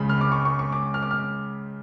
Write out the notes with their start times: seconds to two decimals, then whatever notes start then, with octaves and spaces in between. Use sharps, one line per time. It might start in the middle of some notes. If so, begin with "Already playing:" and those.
Already playing: C#2 C#3 G#3 B5
0.09 F6
0.21 D6
0.32 C#6
0.45 C#6
0.59 C#6
0.72 D6
0.94 F6
1.03 D6
1.11 F6